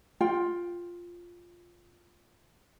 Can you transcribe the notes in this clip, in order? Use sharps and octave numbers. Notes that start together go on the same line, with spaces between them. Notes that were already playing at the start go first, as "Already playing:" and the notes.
F4 G5